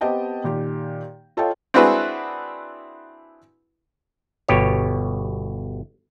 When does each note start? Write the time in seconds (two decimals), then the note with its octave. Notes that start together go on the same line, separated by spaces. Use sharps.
0.01 B3 C4 G4 D#5 G5 A5
0.44 A#2 D#3 G4
1.37 F4 A4 C#5 D#5 F5 G5
1.74 C4 D4 E4 F#4 G#4 B4
4.49 G1 B2 G4 C#5